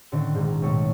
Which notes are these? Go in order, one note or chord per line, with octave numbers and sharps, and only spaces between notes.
A2 D3 D#3 C4
A#1 G#2
B1 A2 A3 C#5